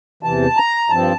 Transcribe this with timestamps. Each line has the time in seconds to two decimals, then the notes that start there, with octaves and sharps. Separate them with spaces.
0.23 E2 C3 E3 A5
0.57 A#5
0.90 G2 F3 C4 A5